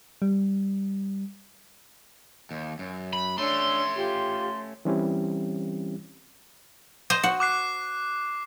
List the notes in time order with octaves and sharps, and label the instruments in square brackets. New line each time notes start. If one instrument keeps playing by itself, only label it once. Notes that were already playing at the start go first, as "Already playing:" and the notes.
[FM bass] G3
[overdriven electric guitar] D#2
F#2
[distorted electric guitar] B5
[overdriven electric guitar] A3 C#4 [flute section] D4 C#5 E6 [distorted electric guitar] C6
[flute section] F4 G4
[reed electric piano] E3 G3 C4 C#4 E4 G4
[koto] C5 D#5
F#4
[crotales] D6 F#6 C7